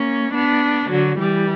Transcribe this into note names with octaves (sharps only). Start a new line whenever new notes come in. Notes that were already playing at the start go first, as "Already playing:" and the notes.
Already playing: A#3 C#4
B3 D4
D3 F#3
E3 G3